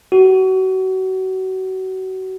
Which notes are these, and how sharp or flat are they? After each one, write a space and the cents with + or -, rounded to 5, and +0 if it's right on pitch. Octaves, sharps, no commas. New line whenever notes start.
F#4 +30